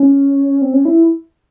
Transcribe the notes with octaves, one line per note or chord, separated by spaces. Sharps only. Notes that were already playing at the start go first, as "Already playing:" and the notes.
Already playing: C#4
C4
C#4
E4